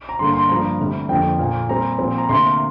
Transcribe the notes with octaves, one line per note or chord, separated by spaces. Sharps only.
A#5
G2 D3 A#3 C6
C6
G2 F3 A#3 A#5
D2 C3 G3
F2 D3 F3 A#3 G5
A#2 F3 A#3
A#2 G3 C4 A#5
A#2 F3 C4
A#5
D2 C3 A#3 C6